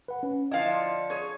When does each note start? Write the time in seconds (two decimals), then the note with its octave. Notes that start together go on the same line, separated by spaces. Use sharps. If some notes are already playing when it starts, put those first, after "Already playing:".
0.08 B4 F#5
0.23 C#4
0.51 D3 F3 E4 D#5 F5
1.10 G#4 C#5